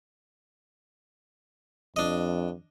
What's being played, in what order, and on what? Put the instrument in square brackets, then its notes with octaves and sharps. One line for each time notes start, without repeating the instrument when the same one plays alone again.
[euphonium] F2 [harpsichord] D4 D#5